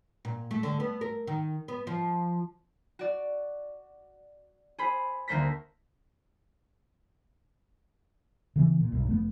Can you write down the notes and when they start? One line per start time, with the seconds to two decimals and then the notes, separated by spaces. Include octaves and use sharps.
0.25 A#2
0.51 A3
0.63 D3
0.80 B3
1.01 A#4
1.27 D#3
1.68 B3
1.87 F3
2.99 F#4 D5
4.78 G#4 C5 B5
5.28 D2 A3 A#3 C5 A#6 B6
8.56 C#3 E3 B3
8.80 A#2
8.92 B1 G2
9.07 F1 A3 B3